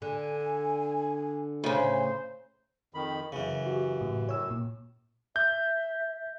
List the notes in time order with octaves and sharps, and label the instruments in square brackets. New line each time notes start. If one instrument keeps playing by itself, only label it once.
[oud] D3 [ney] G#5
[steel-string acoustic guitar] A2 C#3 [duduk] C5 [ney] G#5
[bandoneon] F2 D#3 B5
[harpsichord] F#2 C#3 [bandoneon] E3
[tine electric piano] F#4 G4
[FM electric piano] A2
[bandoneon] F#2 A2 [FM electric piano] C#5 E6
[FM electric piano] A#2
[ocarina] E5 [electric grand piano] G6